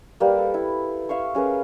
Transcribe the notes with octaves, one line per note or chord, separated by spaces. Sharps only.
G3 A#3 B4 G5
A4
E4
E5 F5 C6 C#6
C#4 G#4 A#4 B4